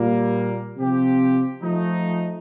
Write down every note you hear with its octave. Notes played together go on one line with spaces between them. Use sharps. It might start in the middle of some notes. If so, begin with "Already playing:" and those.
Already playing: A#2 G3 A#3
C3 F3 C4 G4
F3 A3 D#4